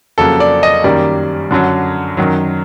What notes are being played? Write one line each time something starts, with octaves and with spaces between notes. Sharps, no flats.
F2 C#3 F#3 A#3 A4
D5
D#5
F#2 D#3 G3 A#3 D5
F#2 D3 F#3
F#2 D#3 F#3